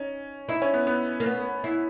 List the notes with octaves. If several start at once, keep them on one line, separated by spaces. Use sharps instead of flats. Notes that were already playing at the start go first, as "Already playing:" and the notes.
Already playing: C#4 D#4
D#4 E4
C#4
B3
B3
A#3
B3
E4